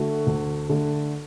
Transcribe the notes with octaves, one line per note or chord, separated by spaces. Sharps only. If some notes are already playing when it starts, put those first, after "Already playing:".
Already playing: D3 A3 F#4 A4
D2
D3 A3